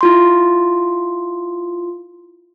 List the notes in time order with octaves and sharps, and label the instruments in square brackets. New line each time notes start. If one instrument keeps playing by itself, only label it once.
[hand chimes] E4 F4 C6